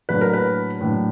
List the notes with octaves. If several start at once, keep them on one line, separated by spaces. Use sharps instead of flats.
A2 F#3 A#3 D4 B4
A#4
B4
A2 F#3 A#3 D4